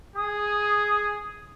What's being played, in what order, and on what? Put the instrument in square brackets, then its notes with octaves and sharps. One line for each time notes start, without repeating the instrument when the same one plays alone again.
[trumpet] G#4 [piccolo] D#6